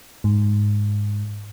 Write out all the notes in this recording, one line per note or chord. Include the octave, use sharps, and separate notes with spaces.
G#2